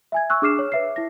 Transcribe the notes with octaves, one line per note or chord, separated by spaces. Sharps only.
E5 G#5 G#6
C#6 E6 F#6
D4 G#4 D6 F6 C7 E7
C#5
B4 E5 C7
E4 A#6